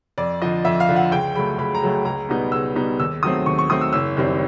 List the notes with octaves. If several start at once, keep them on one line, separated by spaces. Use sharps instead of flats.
F2 D5
D3 F3 D#5
F2 E5
F5
D3 F3
F#5
C#2 G5
C#3 F#3 A3 B5
C#2 B5
A#5
C#3 F#3 A3
C#2 A#5
B2 G3 B3 D#4
C#2 E6
B2 G3 B3 D#4
D#2 E6
D#3 F#3 A3 C4 D#6
D#2 C#6
C#6
D#3 F#3 A3 C4 D#6
E6
F#1 E6
F#2 D#3 G3 C4